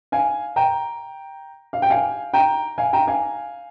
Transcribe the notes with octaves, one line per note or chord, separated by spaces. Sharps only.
F5 G#5
G5 A#5
F5
G5
F5 G#5
G5 A#5
F5 G#5
G5 A#5
F5 G#5